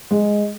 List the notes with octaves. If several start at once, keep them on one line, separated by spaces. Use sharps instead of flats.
G#3